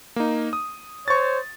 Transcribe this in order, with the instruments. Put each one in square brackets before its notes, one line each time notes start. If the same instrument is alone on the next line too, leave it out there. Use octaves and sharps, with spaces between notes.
[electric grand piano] A#3 D#4
D#6
[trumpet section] C5 C#5 [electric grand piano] C#6 A6